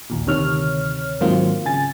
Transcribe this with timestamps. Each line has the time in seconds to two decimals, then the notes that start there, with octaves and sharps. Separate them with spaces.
0.10 A#1 D#2 A#2
0.27 D2 C3 D#3 C#5 F6
1.21 G#2 D#3 F#3 A#3 C4 F4
1.65 C#3 G#5 A6